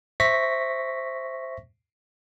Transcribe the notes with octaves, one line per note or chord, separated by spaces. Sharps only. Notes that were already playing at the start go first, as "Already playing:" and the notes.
C5 E5 C#6 A#6 B6